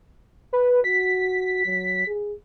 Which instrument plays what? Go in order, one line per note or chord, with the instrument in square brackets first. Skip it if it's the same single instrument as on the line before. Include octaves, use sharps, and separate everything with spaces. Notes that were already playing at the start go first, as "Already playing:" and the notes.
[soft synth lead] B4
[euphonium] F#4 [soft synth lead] B6
[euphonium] F#3
G#4